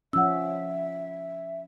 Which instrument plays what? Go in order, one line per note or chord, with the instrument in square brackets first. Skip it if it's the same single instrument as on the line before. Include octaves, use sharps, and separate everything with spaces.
[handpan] F3 C#4 [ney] E5 [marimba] F#5 E6